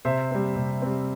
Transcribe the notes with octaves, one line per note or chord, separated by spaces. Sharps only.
C3 C5 E5
G3 C4
C3
G3 C4